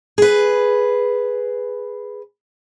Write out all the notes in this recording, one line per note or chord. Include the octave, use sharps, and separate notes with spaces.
G#4 B4